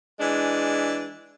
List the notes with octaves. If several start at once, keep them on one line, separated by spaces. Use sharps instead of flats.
E3 G#3 D4